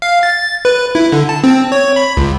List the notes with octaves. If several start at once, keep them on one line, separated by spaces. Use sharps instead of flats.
F5
A6
B4
E4
D3
A5
C4
C#5
B5
C#2